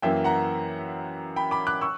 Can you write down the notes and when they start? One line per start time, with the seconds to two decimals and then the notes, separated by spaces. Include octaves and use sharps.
0.02 F#2 E3 A#3 E5 G5
0.24 F#5 A#5
1.36 G5 B5
1.51 B5 D6
1.67 D6 F#6
1.81 C#6 E6